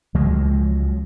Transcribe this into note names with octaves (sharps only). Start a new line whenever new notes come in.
C#2 F3 F#3 G#3